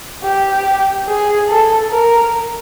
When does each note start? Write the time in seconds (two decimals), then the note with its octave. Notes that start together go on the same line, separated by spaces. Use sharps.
0.24 G4
1.08 G#4
1.49 A4
1.91 A#4